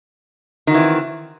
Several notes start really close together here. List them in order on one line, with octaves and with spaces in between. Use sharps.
D#3 F#4 E3 C4